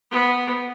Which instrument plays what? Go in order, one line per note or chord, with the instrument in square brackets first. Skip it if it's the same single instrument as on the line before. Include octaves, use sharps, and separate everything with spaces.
[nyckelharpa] B3